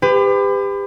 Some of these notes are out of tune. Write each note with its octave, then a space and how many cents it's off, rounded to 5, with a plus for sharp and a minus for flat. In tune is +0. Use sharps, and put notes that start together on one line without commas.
G4 +30 B4 +35